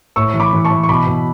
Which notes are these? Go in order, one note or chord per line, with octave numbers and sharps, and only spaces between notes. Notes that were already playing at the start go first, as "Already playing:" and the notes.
A2 C#6 E6
E3
B5 D6
E3
A5 C#6
E3
C#6
B2 B5 D6
B2